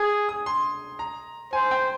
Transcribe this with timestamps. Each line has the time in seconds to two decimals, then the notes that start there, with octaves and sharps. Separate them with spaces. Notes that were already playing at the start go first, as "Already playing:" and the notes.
Already playing: G#4 G#6
0.29 D#6
0.46 C6
0.99 A#5
1.53 C5 G#5
1.71 G5